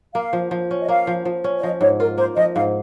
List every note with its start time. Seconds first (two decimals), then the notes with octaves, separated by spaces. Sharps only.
0.15 A#3 F5
0.33 F3
0.51 F3
0.71 C#4
0.82 D#5
0.89 A#3 F5
1.07 F3
1.25 F3
1.44 C#4
1.58 C#5
1.62 F3 D#5
1.81 G#2 C#5
2.00 F4 A#4
2.18 A#3 C5
2.37 F3 D#5
2.55 G#2 F5